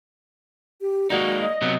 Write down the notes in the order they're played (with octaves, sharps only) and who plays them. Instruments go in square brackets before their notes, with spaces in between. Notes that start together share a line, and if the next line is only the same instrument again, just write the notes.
[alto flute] G4
[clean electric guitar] G#3 A#3 D#4 [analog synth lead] F#4 [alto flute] D5
[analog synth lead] D#5
[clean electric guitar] C3 F#3 B3